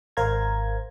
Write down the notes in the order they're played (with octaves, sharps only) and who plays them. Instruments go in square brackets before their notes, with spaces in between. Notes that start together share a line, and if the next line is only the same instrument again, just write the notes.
[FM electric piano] G#1 A#4 C5 F5 A#5 G#6